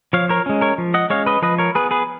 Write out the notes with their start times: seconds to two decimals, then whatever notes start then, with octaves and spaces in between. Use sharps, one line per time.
0.13 F3 C#5 F5
0.29 A#4 C#5
0.46 G#3 C#4
0.61 A#4 C#5
0.78 F3
0.94 D#5 F#5
1.10 G#3 C#4 C#5 F5
1.26 B4 D#5
1.42 F3 B4 D#5
1.58 A#4 C#5
1.75 B3 G#4 B4
1.91 G#4 B4